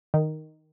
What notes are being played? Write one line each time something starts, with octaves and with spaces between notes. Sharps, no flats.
D#3